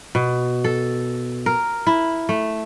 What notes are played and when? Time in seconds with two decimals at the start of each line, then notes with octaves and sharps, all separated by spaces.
0.15 B2
0.64 A4
1.46 A#4
1.87 E4
2.29 A3